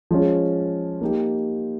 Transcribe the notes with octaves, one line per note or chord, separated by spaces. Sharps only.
F3 G#3 C#4
A#3 D#4 G4